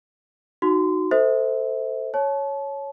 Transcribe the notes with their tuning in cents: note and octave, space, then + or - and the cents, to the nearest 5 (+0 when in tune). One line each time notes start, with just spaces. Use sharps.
D#4 +0 F#4 +0 C6 -25
A4 +20 C5 -10 E5 -30
C#5 +0 A5 -30